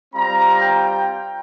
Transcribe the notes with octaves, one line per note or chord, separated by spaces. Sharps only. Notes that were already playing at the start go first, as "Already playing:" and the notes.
G3 C4 F4 A#5
G5